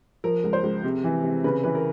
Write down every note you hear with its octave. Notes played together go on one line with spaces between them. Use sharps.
F3 A#4
C#2
C5
C#2
C3
E3
C3
C#3 B4
E3 B4
A#4